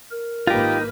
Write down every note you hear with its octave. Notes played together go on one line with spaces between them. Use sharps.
A#4
G#1 A#3 D#4 F4 G4 B4